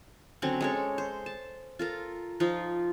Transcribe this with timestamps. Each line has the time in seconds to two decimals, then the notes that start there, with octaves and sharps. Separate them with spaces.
0.42 D3 F#3 C4 C#4
0.61 G#3 A4 C#5
0.98 C5
1.26 A5
1.79 F4 A4 A#4
2.40 F3 D#4 F4